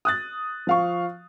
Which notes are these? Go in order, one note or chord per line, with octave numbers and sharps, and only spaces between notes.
D#6 F#6 A6
F3 F5 C#6